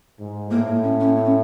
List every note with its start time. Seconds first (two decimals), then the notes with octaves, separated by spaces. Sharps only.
0.18 G#2
0.51 A2 A#3
0.83 C#4
1.00 C#4
1.16 C4
1.24 C#4